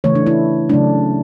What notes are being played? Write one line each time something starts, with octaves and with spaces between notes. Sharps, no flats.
C#3 E3 A3 C#5
D4
E4
C#3 F#3 A3 D4